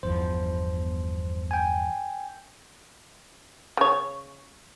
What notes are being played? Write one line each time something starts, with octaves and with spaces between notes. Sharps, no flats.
G1 E2 F3 C5
G5 G#5
C#3 C#5